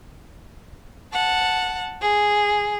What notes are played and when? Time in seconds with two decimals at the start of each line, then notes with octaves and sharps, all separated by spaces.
1.13 F#5 A5
2.02 G#4